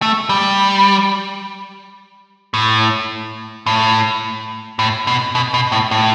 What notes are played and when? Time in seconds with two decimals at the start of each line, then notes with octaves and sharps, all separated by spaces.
0.02 A3
0.29 G3
2.54 A2
3.66 A2
4.79 A2
5.07 B2
5.35 B2
5.54 B2
5.72 A2
5.91 A2